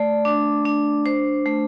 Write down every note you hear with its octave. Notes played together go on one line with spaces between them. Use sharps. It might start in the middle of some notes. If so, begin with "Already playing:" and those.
Already playing: A3 D5
D4
D4
C5
A3